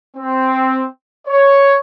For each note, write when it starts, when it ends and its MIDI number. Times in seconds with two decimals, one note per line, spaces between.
0.17 0.84 60
1.27 1.76 73